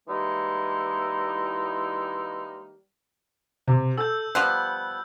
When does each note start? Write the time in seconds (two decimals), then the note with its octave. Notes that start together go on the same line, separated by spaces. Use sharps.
0.08 E3 G3 G#3 A#3 D#4 E4
3.67 C3
3.97 A4 E6 G6
4.35 F3 G3 B3 F#6